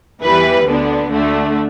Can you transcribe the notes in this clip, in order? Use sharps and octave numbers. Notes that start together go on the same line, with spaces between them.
E2 E3 G3 B4
D2 D3 B3 D4
D2 D3 A3 D4